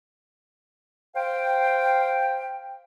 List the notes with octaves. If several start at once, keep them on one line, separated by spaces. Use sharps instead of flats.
C5 F5 G5